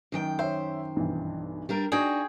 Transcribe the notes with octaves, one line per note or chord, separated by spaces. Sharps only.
F#2 D#3 G5
C5 C#5 E5
B1 G2 E3
G3 D4 A#4
D4 D#4 F#4 G#4 G5